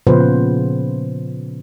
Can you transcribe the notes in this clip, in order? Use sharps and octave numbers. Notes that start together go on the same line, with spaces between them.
A#2 C#3 F3 B3 B4 C5